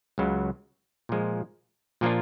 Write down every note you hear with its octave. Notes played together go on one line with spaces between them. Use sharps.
C#2 C#3 F#3
A#2 F3 G#3
A#2 F3 A#3 D4 F4